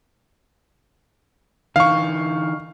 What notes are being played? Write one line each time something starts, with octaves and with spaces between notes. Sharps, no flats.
D3 E3 D#4 F5 C#6